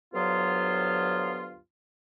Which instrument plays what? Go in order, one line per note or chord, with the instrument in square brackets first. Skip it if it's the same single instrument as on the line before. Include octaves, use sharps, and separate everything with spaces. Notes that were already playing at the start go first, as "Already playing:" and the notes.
[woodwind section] D2 G2 F#3 B3 F4